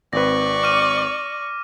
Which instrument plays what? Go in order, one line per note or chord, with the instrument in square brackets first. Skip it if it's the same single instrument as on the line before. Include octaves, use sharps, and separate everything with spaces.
[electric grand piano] G#1 C4 B4 [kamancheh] D5 C#6 [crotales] A#6
[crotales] D6 F6 D#7